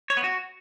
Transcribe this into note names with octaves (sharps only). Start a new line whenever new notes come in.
C#5
B3
F#4